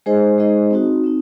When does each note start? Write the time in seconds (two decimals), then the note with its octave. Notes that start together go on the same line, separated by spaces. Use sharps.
0.06 G#3 D#4 G#4 C5 D#5
0.38 G#3 D#4 G#4 C5 D#5
0.71 C4 D#4 F#4
1.04 C4 D#4